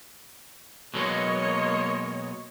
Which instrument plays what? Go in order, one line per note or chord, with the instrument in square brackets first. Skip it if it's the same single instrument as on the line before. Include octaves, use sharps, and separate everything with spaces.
[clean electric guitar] B2 F#3 G#3 [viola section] A#3 C#5 D#5